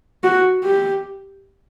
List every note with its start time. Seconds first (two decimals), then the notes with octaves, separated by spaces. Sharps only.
0.24 F#4
0.64 G4